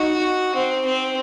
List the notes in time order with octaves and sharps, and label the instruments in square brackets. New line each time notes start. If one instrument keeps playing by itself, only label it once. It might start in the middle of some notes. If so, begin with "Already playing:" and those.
Already playing: [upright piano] D#4 [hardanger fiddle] F#4
[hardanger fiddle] C4
C4